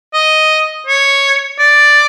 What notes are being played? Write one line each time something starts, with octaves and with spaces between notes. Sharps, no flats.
D#5
C#5
D5